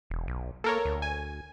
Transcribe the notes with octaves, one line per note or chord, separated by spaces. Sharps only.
E1
B1
A#3 A4 A#4 C#5
D2
G#5